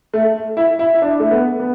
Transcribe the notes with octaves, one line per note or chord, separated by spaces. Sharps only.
A3
E4
E4
E4
D4
A3
B3
B3